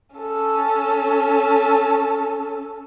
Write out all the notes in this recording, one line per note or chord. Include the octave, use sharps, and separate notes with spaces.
C#4 A4